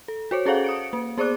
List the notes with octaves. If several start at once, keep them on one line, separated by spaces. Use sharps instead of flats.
A4
F#4 C5 C#5
C#4 G#4 A4 C5 F5 F#5
D#6 C#7 D7
A#3
B3 G#4 C5 D5 D6 F#6